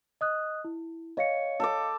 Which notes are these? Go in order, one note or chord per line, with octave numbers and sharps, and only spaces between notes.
D#5 D#6 F#6
E4
C#5 D#5 F5 C#7
A4 G5 D6